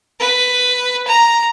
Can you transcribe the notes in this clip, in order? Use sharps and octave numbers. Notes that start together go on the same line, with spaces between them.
B4
A#5